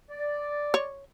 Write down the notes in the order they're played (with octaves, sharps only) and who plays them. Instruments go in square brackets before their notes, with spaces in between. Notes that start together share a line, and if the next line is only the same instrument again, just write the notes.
[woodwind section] D5
[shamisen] C#5